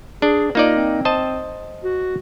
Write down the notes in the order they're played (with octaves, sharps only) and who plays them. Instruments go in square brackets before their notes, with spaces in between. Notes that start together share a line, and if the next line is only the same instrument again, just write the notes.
[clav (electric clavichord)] D4 [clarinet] G#4
[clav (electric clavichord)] A#3 D#4 D5 [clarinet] F4
[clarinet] C4
[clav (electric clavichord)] C5 D#5 A5
[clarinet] F#4